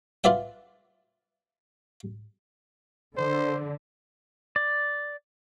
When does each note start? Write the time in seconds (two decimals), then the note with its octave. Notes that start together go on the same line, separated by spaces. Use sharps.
0.24 F4 B4 D5 E5 F#5
3.17 D3 C5
4.56 D5